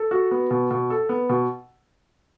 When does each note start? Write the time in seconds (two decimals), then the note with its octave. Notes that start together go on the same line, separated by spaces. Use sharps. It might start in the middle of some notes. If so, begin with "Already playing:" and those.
Already playing: A4
0.11 F#4
0.31 B3
0.50 B2
0.71 B2
0.90 A4
1.09 B3
1.29 B2